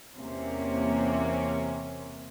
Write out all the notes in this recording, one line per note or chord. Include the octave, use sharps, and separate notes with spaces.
E2 C3 A#3 C#4